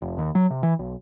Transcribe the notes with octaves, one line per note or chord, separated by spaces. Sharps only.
F1
D#2
F#3
C3
E3
B1